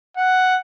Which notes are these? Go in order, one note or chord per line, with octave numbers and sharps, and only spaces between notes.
F#5